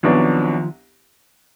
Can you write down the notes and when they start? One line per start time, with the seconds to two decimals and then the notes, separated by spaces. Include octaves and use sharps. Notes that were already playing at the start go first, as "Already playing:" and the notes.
0.03 C2 B2 D#3 F3 F#3 B3 D4